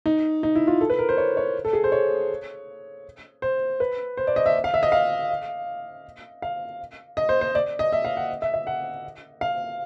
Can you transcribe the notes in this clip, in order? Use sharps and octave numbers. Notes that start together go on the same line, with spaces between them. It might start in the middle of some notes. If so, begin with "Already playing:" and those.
D#4
D#4
E4
F4
A4
B4
A#4
C5
C#5
C#5
A4
G#4
C5
C#5
C5
B4
C5
D5
D#5
E5
F5
E5
D#5
F5
F5
D#5
C5
C5
D5
D#5
E5
F5
F#5
E5
E5
F#5
F5